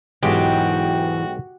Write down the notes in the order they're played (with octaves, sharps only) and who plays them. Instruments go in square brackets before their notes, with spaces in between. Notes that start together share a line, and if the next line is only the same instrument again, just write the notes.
[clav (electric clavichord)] B1 G#3 [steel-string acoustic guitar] G#2 E3 [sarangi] F#4 [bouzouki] G4